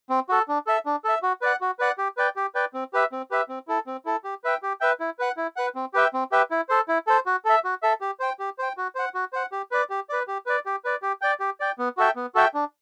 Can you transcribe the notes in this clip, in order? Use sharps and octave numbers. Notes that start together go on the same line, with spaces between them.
C4
F#4 A4
D4
A4 E5
D4
A4 E5
F#4
B4 D5 F#5
F#4
B4 D5 F#5
G4
B4 D5 G5
G4
B4 D5 G5
C4
G4 B4 E5
C4
G4 B4 E5
C4
E4 A4
C4
E4 A4
G4
B4 E5 G5
G4
B4 E5 G5
E4
B4 F#5
E4
B4 F#5
C4
G4 B4 E5 G5
C4
G4 B4 E5 G5
E4
A4 C5
E4
A4 C5
F#4
A4 E5
F#4
A4 E5
G4
C5 G5
G4
C5 G5
F#4
C5 F#5
F#4
C5 F#5
G4
B4 D5
G4
B4 D5
G4
B4 D5
G4
B4 D5
G4
D5 G5
G4
D5 G5
B3
F#4 A4 E5 G5
B3
F#4 A4 E5 G5
D4